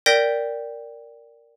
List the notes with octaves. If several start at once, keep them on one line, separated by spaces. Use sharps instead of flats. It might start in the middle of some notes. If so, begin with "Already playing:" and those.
A#4 D5 G5 G6 A#6 B6